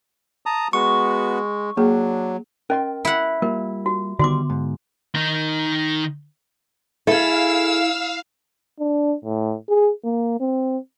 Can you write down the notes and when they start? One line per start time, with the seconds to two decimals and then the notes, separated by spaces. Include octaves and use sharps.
0.46 A5 A#5 D#6
0.73 G#3 B3 F#4 C#6
1.77 F#3 A#3 D4 G#4
2.70 C#4 A#4 D#5 G5 C6
3.05 E4 F#5
3.42 G3 A#3 F4 A#4
3.86 F#4
4.19 D3 D#3 G3 B3 F#4 D5 C6 D6
4.50 G#2
5.15 D#3 D#4
7.07 E4 G#4 A4 F5 E6
8.80 D4
9.24 A2
9.69 G#4
10.04 A#3
10.40 C4